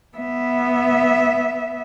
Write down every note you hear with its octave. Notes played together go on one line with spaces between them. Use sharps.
B3 E5